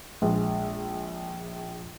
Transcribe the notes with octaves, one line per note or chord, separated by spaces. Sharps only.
A#1 G#3